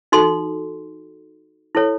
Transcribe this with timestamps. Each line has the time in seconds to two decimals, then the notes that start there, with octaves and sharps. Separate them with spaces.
0.12 D#4 F#4 A4 C6
1.75 E4 A4 C#5